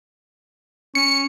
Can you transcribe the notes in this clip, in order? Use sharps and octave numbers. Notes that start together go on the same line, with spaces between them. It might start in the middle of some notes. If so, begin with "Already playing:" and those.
C#4 C#7